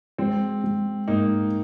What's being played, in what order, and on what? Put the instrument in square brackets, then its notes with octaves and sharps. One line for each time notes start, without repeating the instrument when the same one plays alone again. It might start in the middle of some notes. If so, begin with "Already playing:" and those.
[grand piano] G#3 [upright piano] C4
[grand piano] G#3
[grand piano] G#2 [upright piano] A#3 D#4